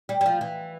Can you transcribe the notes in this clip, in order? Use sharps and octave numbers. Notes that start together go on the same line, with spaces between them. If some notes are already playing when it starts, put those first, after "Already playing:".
G3
G3
F3
E3